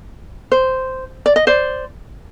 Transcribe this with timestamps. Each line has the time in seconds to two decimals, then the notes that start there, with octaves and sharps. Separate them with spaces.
0.52 C5
1.26 D5
1.36 D#5
1.47 C5 D5